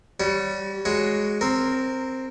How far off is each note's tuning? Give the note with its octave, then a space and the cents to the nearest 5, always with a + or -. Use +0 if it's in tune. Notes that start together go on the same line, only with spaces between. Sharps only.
G3 -5 F#4 +35 C#5 +0
G#3 +5 F#4 +10 C#5 +0
C4 +0 A#4 -15